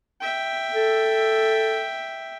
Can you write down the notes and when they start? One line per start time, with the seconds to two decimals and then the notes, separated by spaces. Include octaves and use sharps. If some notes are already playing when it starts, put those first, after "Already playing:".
0.21 E5 G5
0.73 A4